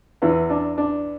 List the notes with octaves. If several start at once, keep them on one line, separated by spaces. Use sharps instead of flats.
E2 E3 B3
D4
D4